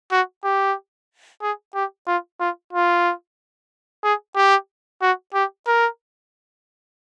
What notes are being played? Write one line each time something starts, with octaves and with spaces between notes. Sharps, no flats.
F#4
G4
G#4
G4
F4
F4
F4
G#4
G4
F#4
G4
A#4